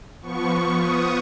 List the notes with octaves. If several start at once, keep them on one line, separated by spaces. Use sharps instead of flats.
F3 B3 C#6
C#6
D#6